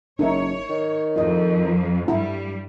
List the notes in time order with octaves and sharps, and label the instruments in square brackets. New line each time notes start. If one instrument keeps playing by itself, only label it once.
[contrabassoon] F#1 [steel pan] D#4 A#4 E5 [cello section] C#5
[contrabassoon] D#3
[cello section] F2 [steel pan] E4 D#5
[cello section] G2 G3 [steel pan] E4